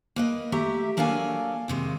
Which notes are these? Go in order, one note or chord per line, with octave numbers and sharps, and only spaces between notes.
A#3 B4 D#5
A3 G4 E5 A#5
F#3 A#3 D4 A4 F5 G#5
D#2 C3 G#3